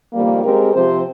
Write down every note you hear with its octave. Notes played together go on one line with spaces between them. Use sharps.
F2 D#3 G3 A#3
G#3 C4 G4 A#4
C3 F3 C4 G4 C5